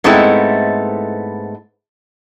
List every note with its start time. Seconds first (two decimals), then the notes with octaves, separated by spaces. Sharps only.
0.04 G#2 G#3 A3 B3 C4 E4